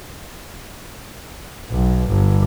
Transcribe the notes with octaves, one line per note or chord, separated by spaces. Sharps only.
B1
G1